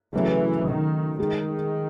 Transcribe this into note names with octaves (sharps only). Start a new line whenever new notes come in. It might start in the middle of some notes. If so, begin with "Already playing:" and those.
C#3 E3 F#3 A3
D#3
D#3 G#3 D#4 G#4